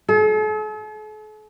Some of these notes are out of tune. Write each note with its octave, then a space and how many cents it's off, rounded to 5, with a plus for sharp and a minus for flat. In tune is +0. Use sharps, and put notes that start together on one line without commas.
A4 -45